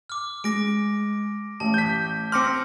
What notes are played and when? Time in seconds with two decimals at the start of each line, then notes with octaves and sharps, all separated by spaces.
0.10 D6 F6
0.44 G#3 D6 A#6 D7
1.60 A1 A5
1.74 G6 B6
2.32 C4 C6 D6 F6 A#6 C#7